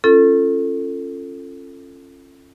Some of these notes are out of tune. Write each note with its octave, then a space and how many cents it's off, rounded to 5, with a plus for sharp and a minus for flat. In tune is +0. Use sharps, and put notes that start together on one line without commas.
C#4 -20 F4 -25 A4 +15